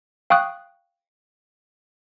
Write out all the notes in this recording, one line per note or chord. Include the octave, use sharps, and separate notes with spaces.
F5 G5 C#6 D#6 F#6